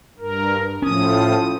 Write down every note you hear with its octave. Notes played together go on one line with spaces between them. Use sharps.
G2 A#4
A2 F3 C#4 D#6